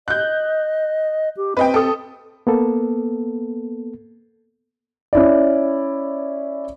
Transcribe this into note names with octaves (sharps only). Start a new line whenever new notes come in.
D#5 F#6 G6
G4
C4 B4 D#5 G5
A4 D#6
A#3 B3 A4
C#4 E4 D5